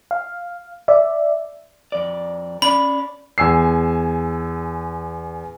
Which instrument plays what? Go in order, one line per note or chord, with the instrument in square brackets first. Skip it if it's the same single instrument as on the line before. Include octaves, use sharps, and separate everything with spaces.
[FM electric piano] F5
D5 E5
[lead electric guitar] F2 D5
[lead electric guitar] C#4 D5 [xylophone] B5
[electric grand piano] E2 G#5 E6 C7